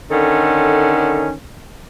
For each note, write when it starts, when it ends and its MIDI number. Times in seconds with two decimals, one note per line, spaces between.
0.11 1.32 50
0.11 1.32 51
0.11 1.32 61
0.11 1.32 69